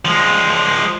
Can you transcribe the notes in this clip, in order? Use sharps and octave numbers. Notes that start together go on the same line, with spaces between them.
F3 G#3